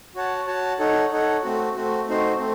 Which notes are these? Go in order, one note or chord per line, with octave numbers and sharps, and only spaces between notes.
F#4 C#5 F#5 A5
F#4 C#5 F#5 A5
D#4 A4 C#5 F#5
D#4 A4 C#5 F#5
A3 C4 F#4
A3 C4 F#4
A3 C4 D#4 F#4 C5
A3 C4